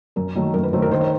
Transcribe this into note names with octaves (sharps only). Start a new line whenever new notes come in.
F#2 A#4
D#3 F#3 A3
F#2 A#4
B4
D#3 F#3 A3 C5
A#4
D#3 C5
C#5